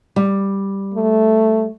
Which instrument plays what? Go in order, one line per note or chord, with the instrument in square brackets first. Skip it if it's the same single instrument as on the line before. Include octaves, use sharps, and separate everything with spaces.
[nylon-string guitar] G3
[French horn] A3